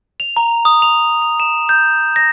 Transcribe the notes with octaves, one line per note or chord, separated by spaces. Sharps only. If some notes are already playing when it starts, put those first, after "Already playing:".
F7
A#5
D#6
F7
F7
E7
G6
A#6